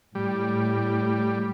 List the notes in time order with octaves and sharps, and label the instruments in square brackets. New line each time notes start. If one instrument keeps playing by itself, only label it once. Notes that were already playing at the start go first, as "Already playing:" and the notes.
[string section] A2 [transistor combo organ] G3